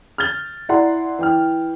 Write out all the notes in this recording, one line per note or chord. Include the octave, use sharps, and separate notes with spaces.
F6 G6 A6 G7
E4 D5 F#5 A#5 C6
E3 G5 F6